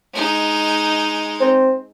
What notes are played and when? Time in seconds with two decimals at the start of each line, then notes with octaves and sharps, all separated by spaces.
0.14 G#3 D#4
1.40 C4